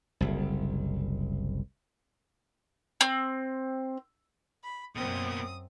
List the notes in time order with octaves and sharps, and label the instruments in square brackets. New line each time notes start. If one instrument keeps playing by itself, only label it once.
[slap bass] F#1 C2
[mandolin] C4
[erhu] B5
[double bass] F#2 C4 [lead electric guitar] B2 A#3 [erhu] D#6